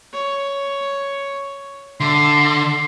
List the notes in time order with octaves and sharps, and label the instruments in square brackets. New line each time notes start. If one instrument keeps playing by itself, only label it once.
[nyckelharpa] C#5
[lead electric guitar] D3 [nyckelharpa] E5 D6 [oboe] C6